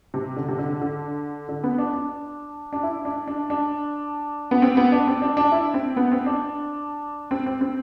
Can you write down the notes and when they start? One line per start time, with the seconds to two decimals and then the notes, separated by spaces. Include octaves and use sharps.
0.14 C3
0.36 D3
0.48 C3
0.59 D3
0.81 D3
1.49 D3
1.63 B3
1.78 D4
1.93 D4
2.73 D4
2.83 E4
3.05 D4
3.28 D4
3.50 D4
4.51 B3
4.62 C4
4.77 B3
4.92 D4
5.07 C4
5.22 D4
5.37 D4
5.52 E4
5.74 C4
5.97 B3
6.12 C4
6.26 D4
7.31 C4
7.46 C4
7.61 C4